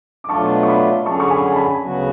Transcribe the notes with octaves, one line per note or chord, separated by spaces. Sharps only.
D6
B2 F#3 A3 D4 F4 A5 C#6
C#6
B5 D6
D3 F#3 C#4 G#4 A5 C#6
C#6
G#5 B5
A5
G#5 B5
D2 C#3 F#3 B3 F#4